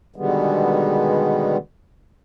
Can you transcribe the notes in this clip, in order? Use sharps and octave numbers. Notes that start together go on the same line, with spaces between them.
B2 D3 D#3 G3 G#3 B3